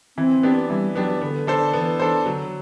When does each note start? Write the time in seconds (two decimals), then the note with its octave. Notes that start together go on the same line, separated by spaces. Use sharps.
0.18 E3 C4
0.43 B3 D4 G4
0.69 E3 G3
0.96 F#3 B3 D4 G4
1.21 D3 B3
1.47 D4 A4 C5
1.73 E3 B3
2.00 D4 A4 C5
2.26 D3 F#3